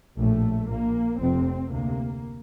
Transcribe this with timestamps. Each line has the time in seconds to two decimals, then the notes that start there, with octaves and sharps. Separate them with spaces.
0.17 A#1 A2 A3
0.69 A#1 A#2 A#3
1.20 F1 F2 C3 C4
1.71 D2 C3 A#3